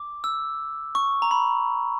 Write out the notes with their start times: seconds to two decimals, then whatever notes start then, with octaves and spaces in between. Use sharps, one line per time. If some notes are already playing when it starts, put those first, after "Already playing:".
Already playing: D6
0.24 E6
0.95 C#6
1.22 A#5
1.31 B5